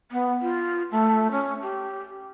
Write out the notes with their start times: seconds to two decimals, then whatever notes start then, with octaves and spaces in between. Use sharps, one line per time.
0.12 B3
0.42 F4
0.92 A3
1.31 C#4
1.62 G4